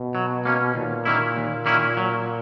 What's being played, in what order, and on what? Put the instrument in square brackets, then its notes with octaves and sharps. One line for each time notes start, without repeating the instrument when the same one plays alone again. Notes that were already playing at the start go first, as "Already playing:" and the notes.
Already playing: [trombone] B2
[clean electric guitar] F#3
A#3 C#4
[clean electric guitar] D#2 [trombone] A#2
[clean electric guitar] D#3 A#3 C#4 E4
D#2
D#3 A#3 C#4 E4
F#3